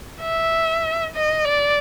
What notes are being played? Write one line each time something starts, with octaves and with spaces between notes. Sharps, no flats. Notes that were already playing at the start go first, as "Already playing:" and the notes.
E5
D#5
D5